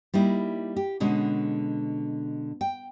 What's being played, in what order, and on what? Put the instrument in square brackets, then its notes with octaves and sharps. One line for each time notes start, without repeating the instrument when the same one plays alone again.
[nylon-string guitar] G3 A#3 D#4 E4
G4
B2 D3 G#3 C#4
G5